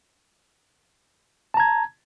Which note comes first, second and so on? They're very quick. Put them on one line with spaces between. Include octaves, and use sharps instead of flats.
A5 A#5 G#6